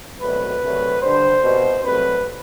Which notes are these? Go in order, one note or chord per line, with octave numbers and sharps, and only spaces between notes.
C2 B2 F#3 A3 B4
C2 C3 F#3 A3
G2 D3 G3 C5
C2 B2 G3
C2 C3 F#3 A3 B4